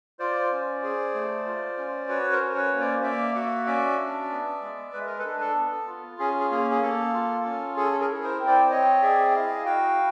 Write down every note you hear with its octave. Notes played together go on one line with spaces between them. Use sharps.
F4 C5 D5
C#4
G#4
A3
F4
C#4
F#4 B4 C#5
A#4 C5
C#4
B4 C#5
A#3
C5 D5
A#3 D5 E5
F#4 E5 F#5
C#4 D5 E5
D4
B3
G#3
G#3 B4
A#4
A4 B4
D4
A4
B3
F4
C#4 G#4
G#4
A#3 G#4
G#4
A#3 A4
F4
C#4
G#4 A4
A4
G#4 A#4
E4
A#4 C5
C4
C5 D5
C4 C#5 D#5
G#4 D5 E5
E5
E4 D#5 F5
F#4 F5 G5